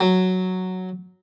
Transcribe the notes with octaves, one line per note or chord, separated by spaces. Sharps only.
F#3